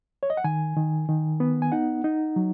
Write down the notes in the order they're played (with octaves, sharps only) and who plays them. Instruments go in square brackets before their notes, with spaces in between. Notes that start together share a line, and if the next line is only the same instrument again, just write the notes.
[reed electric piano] C#5
D#5
F#5
D#3 G#5
D#3
D#3
B3
G#5
D#4 F#5
D#4
F#3